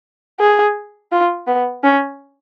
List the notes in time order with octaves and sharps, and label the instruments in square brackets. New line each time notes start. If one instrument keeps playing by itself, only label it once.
[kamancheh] G#4
F4
B3
C#4